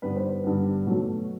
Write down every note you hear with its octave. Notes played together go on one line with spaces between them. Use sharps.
G2 D3 G3 B3 B4
C5
B4
G2 D3 G3 B3
B2 F#3 A3